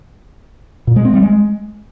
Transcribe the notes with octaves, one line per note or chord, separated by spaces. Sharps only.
A#2
G#3
C4
G3
G#3